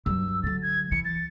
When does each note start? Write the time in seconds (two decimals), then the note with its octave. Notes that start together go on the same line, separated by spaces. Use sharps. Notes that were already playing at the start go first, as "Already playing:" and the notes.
0.06 G2 F#3 E6
0.43 D3 F#3 A6
0.62 G#6
0.92 E3 C#7
1.05 A6